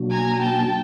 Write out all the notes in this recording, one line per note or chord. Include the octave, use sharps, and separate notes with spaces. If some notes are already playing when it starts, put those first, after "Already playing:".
Already playing: B2 F#3 A#3 D4 F#4
G#5 A#5
G5 A5